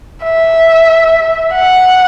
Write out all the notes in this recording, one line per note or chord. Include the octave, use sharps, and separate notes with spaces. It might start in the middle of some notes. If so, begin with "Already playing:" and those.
E5
F#5